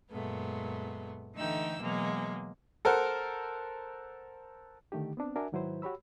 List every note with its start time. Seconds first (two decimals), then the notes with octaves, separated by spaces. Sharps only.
0.12 F#2 A#2 G#3 A3 B3
1.35 D3 E3 A3 D#4 G5 E6
1.81 B2 E3 F#3 G#3 A#3
2.85 A4 A#4 C5 F#5
4.92 D3 D#3 A3 D#4 G4
5.17 B3 C4 D4
5.36 D4 F#4 A#4 E5 G#5
5.52 G#2 D#3 F#3 E4 B4 C5
5.82 F#4 G4 C#5 B5 E6